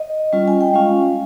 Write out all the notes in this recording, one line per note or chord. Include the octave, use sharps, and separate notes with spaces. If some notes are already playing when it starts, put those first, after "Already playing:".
Already playing: D#5
G3 C#4 F4
G#5
G5
G#3 C#4 F4 F5